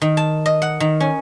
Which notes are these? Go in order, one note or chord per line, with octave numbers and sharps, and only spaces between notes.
D#3
A5
D#5
F#5
D#3
C#4